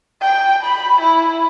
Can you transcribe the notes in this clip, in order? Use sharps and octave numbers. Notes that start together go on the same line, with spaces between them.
G5
B5
E4